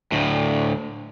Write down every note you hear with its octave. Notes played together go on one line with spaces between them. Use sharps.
D2 A2